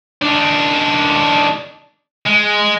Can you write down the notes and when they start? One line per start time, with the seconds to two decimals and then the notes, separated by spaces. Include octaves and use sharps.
0.22 D#3 D4
2.26 G#3